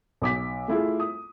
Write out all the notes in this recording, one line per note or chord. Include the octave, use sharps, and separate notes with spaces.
B1 D6 B6
A3 E4 F4 G#4
D#6